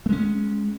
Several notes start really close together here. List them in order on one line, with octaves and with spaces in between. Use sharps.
A3 G#3 C#4